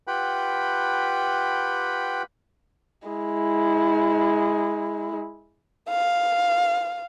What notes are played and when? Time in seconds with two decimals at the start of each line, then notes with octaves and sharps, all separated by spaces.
0.07 F4 G4 B4 F#5 G5 B5
3.08 G#3 E4
5.90 F5